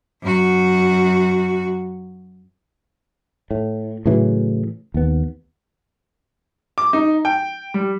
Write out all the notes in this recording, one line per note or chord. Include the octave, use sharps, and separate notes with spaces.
F#2 F#4
A2
A2 C#3 E3 F#3
D#2 B3
D6
D#4
G5
G3